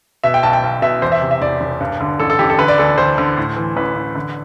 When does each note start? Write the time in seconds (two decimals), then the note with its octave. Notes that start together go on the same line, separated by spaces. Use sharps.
0.24 B2 E5
0.34 G5
0.43 B1 A5
0.53 G5
0.63 B1
0.82 B2 E5
1.02 E2 C5
1.12 E5
1.22 C3
1.31 E5
1.42 E1 D5
1.61 E1
1.80 G2
2.01 D3
2.20 A1 A4
2.30 A4
2.39 A1 G4
2.50 A4
2.59 D3 B4
2.68 D5
2.78 D2 A4
2.98 D2 C5
3.18 D3
3.37 A2
3.57 E3
3.76 A1 B4
3.96 A1
4.15 D3